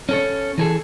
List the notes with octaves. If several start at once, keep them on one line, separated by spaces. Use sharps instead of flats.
C#4 A4 C#5
E3 G#4 A4